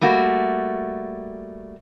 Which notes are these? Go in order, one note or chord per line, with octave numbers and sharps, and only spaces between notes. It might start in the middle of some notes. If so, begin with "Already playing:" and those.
G3 A3 A#3 F#4